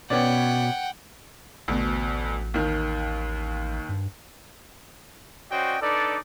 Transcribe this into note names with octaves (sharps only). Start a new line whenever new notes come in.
B2 B3 C#4 D5 F#5 G5
A1 D2 B2
D#2 D#3
G2
C#4 F#4 C5 D5 D#5 G5
D4 D#4 A4 B4 D5